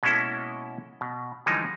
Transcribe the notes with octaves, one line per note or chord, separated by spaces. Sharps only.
B2 G#3 A#3 C#4 E4 A4
B2
D3 E3 F3 G3 G#3 D#4